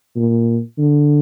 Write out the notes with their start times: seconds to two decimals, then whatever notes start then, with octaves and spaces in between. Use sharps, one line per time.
0.16 A#2
0.78 D3